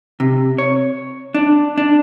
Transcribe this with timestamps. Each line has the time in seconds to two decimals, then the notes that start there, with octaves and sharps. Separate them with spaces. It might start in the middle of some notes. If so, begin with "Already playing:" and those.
0.20 C3
0.58 C#5
1.34 D4
1.78 D4